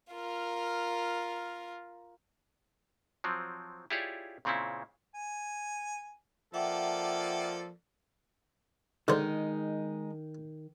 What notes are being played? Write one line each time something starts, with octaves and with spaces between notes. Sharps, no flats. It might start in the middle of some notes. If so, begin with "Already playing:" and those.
F4 A#4
F3 F#3 C4
E4 F4 G4 G#4 C#5 D5
A#2 C#3 C4 C#4 E4
G#5
F3 A#3 A4 D5 E5 F#5 G5
D3 D#3 G#3 D#4 C5